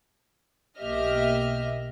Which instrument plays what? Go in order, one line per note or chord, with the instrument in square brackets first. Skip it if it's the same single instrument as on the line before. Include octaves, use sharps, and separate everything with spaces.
[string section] B1 A#3 G4 D#5 E5 F6